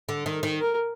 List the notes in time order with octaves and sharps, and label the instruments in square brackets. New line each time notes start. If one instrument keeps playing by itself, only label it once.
[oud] D3
D#3
D#3
[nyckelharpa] A#4